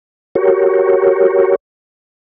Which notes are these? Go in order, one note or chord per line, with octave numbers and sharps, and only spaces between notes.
F#4 G4 A#4 C#5